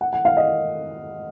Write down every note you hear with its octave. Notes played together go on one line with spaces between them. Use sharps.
F#5
F#5
F5
D#5